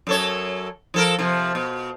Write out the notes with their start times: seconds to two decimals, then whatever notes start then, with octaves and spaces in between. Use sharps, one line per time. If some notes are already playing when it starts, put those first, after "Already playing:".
0.07 F#2 A4 C#5
0.94 F3 A4 A#4
1.19 C3 F3
1.55 B2